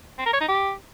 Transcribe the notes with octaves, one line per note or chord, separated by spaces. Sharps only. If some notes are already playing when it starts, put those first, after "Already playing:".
C4
A#4
C#5
D#4
G4